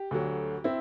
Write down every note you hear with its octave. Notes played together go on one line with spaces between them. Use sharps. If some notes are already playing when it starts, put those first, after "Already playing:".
Already playing: G4
D2 D3 F#3
C4 E4